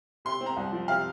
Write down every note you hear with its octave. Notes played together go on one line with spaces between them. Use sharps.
C3 C6
C4
A#5
C2
F3
C3 F5